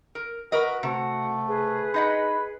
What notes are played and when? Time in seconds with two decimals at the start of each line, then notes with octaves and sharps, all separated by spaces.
0.15 A#4
0.52 F#4 A#4 B4 D#5
0.83 C3 A3 F#4 F#5
1.48 G#4 B4
1.94 D#4 D#5 F#5 B5